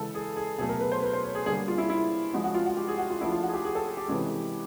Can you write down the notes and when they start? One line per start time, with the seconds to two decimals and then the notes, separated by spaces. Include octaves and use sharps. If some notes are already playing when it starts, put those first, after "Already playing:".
Already playing: C#3 E3 G#3 A4
0.14 G#4
0.36 G#4
0.58 B2 F#3 A3 G#4
0.69 A#4
0.81 B4
0.92 C5
1.02 B4
1.13 C5
1.24 C#5
1.35 G#4
1.46 D3 G3 A#3 G#4
1.68 F4
1.78 E4
1.90 E4
2.33 F3 G#3 C#4 F#4
2.44 F#4
2.54 F4
2.66 F#4
2.77 G4
2.88 G#4
2.98 F#4
3.10 F4
3.21 F3 A3 D4 E4
3.32 F4
3.43 F#4
3.49 G#4
3.54 G4
3.65 G#4
3.75 A4
3.86 G#4
3.97 G4
4.08 C3 E3 G#3 C#4